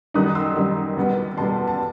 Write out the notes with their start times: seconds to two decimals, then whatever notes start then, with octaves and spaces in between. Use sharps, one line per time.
0.14 F#2 D#3 G3 D#4 D#6 F#6
0.35 C6 E6
0.56 F#2 D#3 G3 D#4
0.97 E2 B2 G3 B3
1.37 E2 B2 G3 B3 A5 C6
1.68 A5